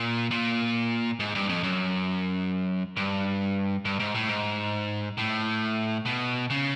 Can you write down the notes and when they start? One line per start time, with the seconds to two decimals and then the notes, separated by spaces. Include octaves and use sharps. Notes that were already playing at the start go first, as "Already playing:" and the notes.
Already playing: A#2
0.31 A#2
1.20 G#2
1.35 G2
1.49 F2
1.63 F#2
2.97 G2
3.85 G2
3.99 G#2
4.15 A2
4.29 G#2
5.17 A2
6.05 B2
6.50 C#3